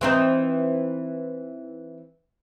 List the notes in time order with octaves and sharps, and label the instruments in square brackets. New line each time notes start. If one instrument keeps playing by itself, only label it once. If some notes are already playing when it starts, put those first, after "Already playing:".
[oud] E3 C4 D#4